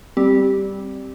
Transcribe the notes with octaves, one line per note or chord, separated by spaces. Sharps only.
G3 C4 G4